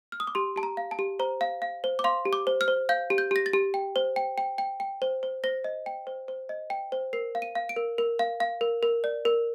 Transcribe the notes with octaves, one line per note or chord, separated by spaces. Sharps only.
F6
D#6
D6
G4 C6
G4 A5
A#5
F5
A5
G4
C5 A#5
F5
F5
C5
D6
F5 C6
G4
D6
C5
F6
C5
F5 G6
G4
G6
G4 A#6
A6
G4
G5
C5
G5
G5
G5
G5
C5
C5
C5 A#6
D#5
G5
C5
C5
D#5
G5
C5
A#4 C7
F5
D#7
F5
D7
A#4
A#4
F5
F5
A#4
A#4
D5
A#4